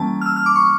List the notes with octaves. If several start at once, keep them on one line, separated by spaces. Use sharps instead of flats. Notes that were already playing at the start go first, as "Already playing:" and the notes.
Already playing: E3 G3 A#3 C#4 A5
F6
E6
F6
D6
C#6